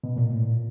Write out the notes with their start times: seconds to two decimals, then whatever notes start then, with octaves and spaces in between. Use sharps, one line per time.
0.04 B2
0.16 A#2
0.29 A2
0.43 A#2